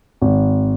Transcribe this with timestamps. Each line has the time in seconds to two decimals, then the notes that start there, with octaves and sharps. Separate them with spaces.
0.21 G#1